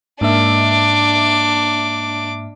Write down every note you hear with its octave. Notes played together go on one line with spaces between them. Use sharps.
G#2 A#3 D4 E5 D6